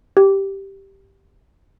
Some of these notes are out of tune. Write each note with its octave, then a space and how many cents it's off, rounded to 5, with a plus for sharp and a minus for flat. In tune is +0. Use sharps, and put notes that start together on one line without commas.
G4 -5